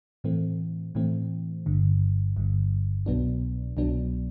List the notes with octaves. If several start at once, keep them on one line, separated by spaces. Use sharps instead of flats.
A2 E3 A3 C4
A2 E3 A3 C4
G1 G2 D3
G1 G2 D3
C2 B2 F#3 B3 D4
C2 B2 F#3 B3 D4